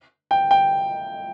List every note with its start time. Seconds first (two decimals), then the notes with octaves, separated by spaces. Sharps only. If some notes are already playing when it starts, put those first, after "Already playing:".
0.31 G5
0.51 G5